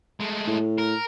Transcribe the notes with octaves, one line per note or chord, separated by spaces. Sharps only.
G#3 A3
A2
A#4